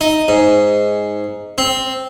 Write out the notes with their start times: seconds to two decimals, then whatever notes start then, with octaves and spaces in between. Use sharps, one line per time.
0.01 D#4
0.28 G#2
1.58 C4